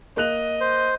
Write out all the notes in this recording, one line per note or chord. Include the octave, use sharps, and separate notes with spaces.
A#3 D#5 F#6 F7
C5